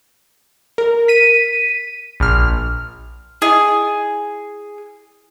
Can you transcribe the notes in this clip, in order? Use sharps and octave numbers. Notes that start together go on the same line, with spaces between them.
A#4
B6 D#7
A#1 F6
E4 G#4 D#5 G#5